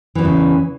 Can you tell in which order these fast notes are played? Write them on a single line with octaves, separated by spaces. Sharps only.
E3 E2 A2 C#3